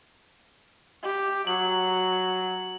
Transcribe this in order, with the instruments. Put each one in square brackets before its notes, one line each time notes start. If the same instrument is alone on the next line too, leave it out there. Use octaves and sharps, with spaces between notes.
[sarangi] G4
[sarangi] F#3 [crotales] F#7